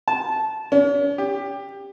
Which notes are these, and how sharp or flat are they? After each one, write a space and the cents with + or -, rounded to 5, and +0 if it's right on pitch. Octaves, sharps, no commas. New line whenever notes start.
A5 -15
C#4 +45
G4 +20